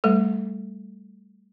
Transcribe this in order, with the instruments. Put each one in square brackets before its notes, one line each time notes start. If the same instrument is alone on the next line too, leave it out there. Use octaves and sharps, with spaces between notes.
[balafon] G3 A3 A4